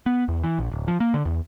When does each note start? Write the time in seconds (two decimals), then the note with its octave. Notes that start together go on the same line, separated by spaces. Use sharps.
0.06 B3
0.28 E2
0.43 E3
0.59 A#1
0.72 D1
0.88 F3
1.00 A#3
1.14 D3
1.25 E2